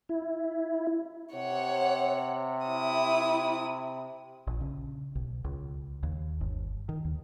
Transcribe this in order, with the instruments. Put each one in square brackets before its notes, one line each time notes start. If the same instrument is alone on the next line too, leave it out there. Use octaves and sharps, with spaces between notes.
[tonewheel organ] E4
[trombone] C3 [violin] C#5 F#5
[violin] E4 D#6
[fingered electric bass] A#1
C#3
B1
C#2
D#2
G1
D#3
D#2